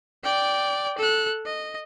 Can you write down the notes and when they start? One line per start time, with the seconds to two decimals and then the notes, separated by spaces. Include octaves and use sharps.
0.23 D5 G5
0.98 A4 F#6
1.46 D#5